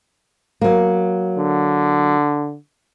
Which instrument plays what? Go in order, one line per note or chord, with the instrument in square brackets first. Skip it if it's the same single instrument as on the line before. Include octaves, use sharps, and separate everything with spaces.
[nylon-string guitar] F#3 A#3
[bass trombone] D3